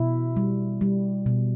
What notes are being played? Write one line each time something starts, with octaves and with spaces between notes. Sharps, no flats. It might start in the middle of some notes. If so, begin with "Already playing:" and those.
Already playing: B2 E4
G3
G3
B2